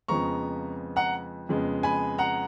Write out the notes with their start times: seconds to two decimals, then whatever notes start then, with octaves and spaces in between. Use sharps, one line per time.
0.08 F2 C#3 F3 G#3 B3 A#5 C#6
0.96 F#5 A#5
1.49 F2 C#3 G#3 B3
1.83 G#5 B5
2.18 F#5 A#5